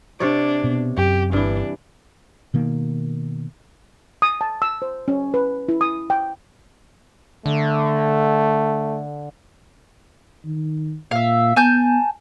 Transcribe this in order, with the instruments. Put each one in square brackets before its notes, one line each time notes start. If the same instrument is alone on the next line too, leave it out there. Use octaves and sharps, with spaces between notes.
[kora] C3 C#5 D5 [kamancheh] D4
[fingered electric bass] B2
[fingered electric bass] F#2 [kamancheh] G4
[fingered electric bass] G1 [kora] G2 E3 [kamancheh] D4
[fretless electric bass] B2 D#3 A#3
[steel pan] D#6
A5
E6
C5
C#4
B4
E4
D#6
G5
[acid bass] D3 [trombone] A3
[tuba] D#3
[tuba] A#2 [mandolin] E5 F5
[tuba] B3 [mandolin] G#5 A5 G6